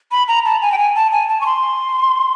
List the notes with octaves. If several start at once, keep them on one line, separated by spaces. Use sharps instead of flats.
B5
A#5
A5
G#5
G5
G#5
A5
G#5
A5
C#6
C6